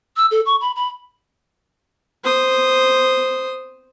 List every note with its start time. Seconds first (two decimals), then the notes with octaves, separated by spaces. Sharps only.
0.17 E6
0.31 A4
0.46 C#6
0.61 B5
0.76 B5
2.24 C5 D#6